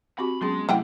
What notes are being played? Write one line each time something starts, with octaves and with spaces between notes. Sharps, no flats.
C4 F#4 G4 B5
F#3 G#3 B3 C#4 G#4 C6
C3 E3 F#3 A3 E4 F#5 G5